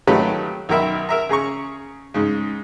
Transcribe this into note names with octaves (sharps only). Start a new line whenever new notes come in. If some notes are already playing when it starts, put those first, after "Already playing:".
D#3 F#3 A3 F4 G4 B4
B1 D#3 A#4 E5 B5
A#4 E5 A#5
C#3 G#4 A#5 C#6
G#2 C#3